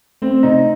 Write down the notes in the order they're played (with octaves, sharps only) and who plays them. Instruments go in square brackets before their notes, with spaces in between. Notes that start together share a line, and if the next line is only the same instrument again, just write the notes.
[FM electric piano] A3 [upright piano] C4
[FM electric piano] C3 [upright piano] D#4